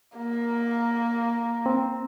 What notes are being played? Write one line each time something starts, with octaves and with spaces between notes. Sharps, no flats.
A#3
C4